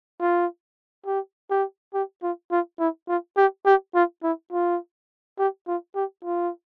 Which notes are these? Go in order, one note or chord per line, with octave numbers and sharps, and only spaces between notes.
F4
G4
G4
G4
F4
F4
E4
F4
G4
G4
F4
E4
F4
G4
F4
G4
F4